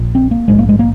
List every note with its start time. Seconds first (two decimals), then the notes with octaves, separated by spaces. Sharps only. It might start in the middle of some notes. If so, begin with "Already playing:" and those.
Already playing: A#1 A#2
0.15 C4
0.31 A#3
0.48 A#1 G#2 G#3
0.59 A#3
0.69 G#3
0.79 A#3